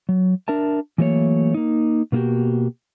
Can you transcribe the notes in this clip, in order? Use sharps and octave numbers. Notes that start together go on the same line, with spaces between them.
F#3
D4 A#4 E5 A5
E3 F#3 A3 A#3 C#5
A#3 D#4
B2 A#3 E4 F#4 G4